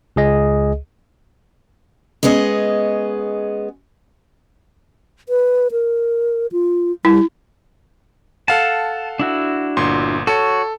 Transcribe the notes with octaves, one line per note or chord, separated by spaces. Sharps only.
C#2 G#4 D#5
G#3 B3 C#4 G#4 D#5
B4
A#4
F4
G3 E4
A4 F5 F#5 A5
D4 E4 F#4
G1 A#2 C6
F#4 A4 C#5